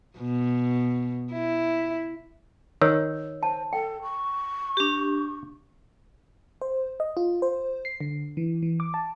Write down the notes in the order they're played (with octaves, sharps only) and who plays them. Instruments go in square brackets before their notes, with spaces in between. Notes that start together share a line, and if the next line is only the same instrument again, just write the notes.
[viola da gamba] B2
E4
[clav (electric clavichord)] D#3 [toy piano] C#5 E6
[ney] C5 [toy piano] A5
[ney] A4 [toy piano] G5
[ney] C#6
[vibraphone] D4 G4
[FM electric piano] C5
D#5
F4
C5
C7
D3
E3
E3
D6
A5